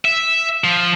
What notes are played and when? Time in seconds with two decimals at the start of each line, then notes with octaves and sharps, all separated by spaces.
0.05 E5
0.64 F3